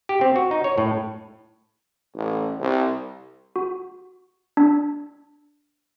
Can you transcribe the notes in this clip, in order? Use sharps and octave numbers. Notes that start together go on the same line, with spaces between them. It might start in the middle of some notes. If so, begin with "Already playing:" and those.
G4
C4
F#4
D#4
C#5
A2
A1
C2
F#4
D4